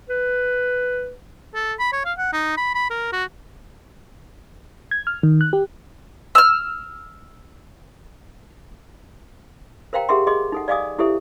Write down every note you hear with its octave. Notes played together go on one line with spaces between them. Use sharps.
B4
A4
B5
C#5
F5
F#5
D#4
B5
B5
A#4
F#4
G#6
F6
D#3
F#6
G4
E6 F6
A#4 C5 F5 G5 A#5
G4 G#4 A#4 E5 F#5 C6
G#4 D#5 C6 D6
D#4 A4 F#5
D5 D#5 F5 G#5 D6 D#6
E4 G4 A4 C5 E5